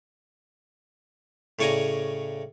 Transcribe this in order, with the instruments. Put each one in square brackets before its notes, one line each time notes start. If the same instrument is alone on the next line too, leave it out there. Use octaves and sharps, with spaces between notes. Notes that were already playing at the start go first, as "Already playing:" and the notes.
[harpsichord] A2 C#3 C#5 D5 G#5 A#5